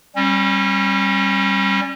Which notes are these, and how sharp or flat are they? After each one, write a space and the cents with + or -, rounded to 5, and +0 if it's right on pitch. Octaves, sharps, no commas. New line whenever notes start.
G3 +0 C#4 -35